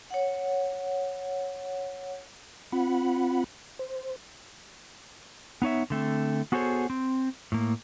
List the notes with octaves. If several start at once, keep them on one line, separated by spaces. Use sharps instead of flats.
C#5 F#5
C4 F4 F#5 B5
C5
B3 D#4 C#5 E5
D3 A3 C4
B3 F#4 G#4 A4 C5 C#5
C4
A2 A#3